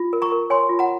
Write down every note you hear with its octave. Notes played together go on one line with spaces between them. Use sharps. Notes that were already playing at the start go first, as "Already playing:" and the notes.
Already playing: F4
A#4
A#5 C#6
A#4
C#5 G#5 C6
F4
F#5 A#5